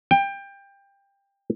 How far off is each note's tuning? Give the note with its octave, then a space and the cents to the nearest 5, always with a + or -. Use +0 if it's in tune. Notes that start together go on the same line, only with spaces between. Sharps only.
G5 +20